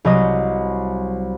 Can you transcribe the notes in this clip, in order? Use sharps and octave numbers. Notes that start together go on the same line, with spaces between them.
C2 F#3 D#5 D#6